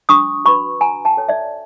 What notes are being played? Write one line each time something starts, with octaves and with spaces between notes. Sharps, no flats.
D4 C#6 D#6
F#4 B4 B5 C#6
F#4 G#5 A#5
G5 A5
A4 C#5
D5 E5